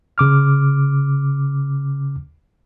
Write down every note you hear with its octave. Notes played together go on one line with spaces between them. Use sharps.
C#3 D6 F6